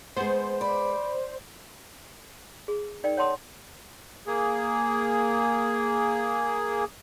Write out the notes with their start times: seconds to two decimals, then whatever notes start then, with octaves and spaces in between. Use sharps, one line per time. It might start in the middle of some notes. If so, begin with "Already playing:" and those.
0.16 G#3 B3 C5
0.61 D5 B5
2.68 G#4
3.04 D#4 A#4 D5 G5
3.17 C#5 F#5 A5 C6 D#6
4.27 A#3 G#4